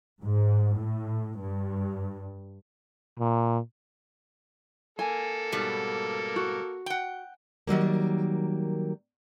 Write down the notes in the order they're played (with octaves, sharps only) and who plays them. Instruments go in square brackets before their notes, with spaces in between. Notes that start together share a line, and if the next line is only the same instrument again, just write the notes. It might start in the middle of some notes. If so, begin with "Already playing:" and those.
[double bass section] G#2
A2
G2
[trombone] A#2
[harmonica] A#3 A4 [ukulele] G#5
[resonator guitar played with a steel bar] G#2 B2 G3
[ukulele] F#4
[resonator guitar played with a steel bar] F#5 G5
[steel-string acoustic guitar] D#3 F#3 G3 A#3